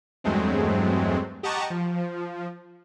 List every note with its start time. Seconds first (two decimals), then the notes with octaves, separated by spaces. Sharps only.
0.24 E2 G2 F#3 G#3 A3 C4
1.43 G4 D#5 F#5 A5 A#5 C#6
1.70 F3